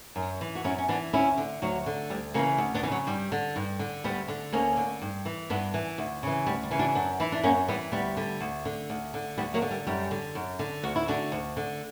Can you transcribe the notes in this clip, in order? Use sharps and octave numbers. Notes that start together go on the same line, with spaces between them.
F#2
E3
F#4
F#2 C#4 E4
C#4
E3 B3 D4
D2 C#4 E4
D3
D2 F#3
D3
D2 G3
C#3 E3 F#3 A#3
D2
B3 D4
C#3 E3
F#3
G2 G3
D3
G2
D3
D2 G3 B3
D3
D2 A#3 C#4
D3
G2
E3
G2 B3 D4
E3
D2
C#3 E3
D2 G3
G3
C#3 E3
D4 F#4
F#2 B3 D4
E3 E4
D4
F#2 A#3 C#4
E3 G3 B3
D2 G3 B3
D3
D2
D3
D2
D3
D2 G3 B3
F#3 A#3
D3
G3
F#2 G3
D3
F#2
D3
D2 F#4
E4
D3 D4 F#4
D2
D3